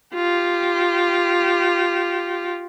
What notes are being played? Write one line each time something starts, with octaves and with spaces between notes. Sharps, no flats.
F4 G4